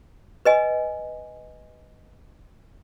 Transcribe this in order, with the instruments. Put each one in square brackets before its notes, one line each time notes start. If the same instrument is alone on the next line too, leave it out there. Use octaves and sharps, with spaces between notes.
[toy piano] B4 D#5 G#5